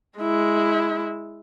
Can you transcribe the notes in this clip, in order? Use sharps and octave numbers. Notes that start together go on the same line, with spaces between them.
G#3 E4